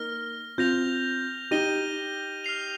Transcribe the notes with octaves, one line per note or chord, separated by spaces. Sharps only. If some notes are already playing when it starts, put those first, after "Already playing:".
Already playing: A#3 D#4 F6 A#6 G7
C4 F4 G6 A#6 F7
D#4 G4 A#6 D#7 G7
F6 C7 F7